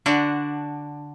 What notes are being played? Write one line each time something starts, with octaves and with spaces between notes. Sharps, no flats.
D3 D4 F#4